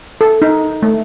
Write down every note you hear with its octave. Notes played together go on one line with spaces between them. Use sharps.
A4
D#4
A3